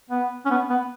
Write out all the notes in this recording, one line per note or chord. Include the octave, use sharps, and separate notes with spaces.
B3
C#4
B3
B3